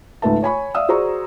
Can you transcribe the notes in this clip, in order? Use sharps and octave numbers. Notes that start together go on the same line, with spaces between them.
C#2 G#2 A3 B4 E5 A5
C#5 G#5 B5 C#6
D5 E5 F5 D#6 E6
F#4 G#4 C5 D5 A#5 C#6